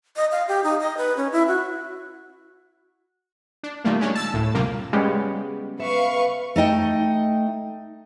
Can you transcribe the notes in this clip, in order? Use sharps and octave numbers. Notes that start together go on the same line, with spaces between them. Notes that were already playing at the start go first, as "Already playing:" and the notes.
D#5
F5
G4
D#4
D#5
B4
C#4
E4
F#4
D4
A#2 D#3 G3 A3 A#3
G#3 C#4 D4
A5 E6 A6
D2 A2
F#2 C3 G3 A#3 F4
C#3 G3 G#3 B3 C#5
B4 E5 F5 C#6
A3 D#4 D#5 G5